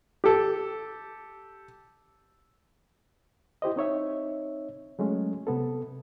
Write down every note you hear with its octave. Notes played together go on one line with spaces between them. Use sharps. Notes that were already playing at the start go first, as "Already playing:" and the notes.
G4 A4
E4 G4 C5 D#5
C4 D#4 C#5 E5
F#3 G#3 A3 C#4
C3 B3 A4